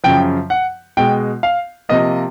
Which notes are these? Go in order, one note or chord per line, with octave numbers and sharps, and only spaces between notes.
F#2 C#3 F3 G5
F#5
B2 G#3 G5
F5
C3 F3 A#3 D#5